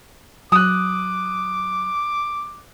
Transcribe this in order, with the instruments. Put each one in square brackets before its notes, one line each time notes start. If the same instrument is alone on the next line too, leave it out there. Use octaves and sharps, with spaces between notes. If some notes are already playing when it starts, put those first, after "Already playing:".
[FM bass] F#3 [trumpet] D6 [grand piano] D#6 F#6